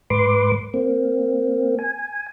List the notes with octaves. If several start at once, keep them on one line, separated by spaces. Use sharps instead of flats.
G#2 B4 C6 D6
A#3 C4
G#5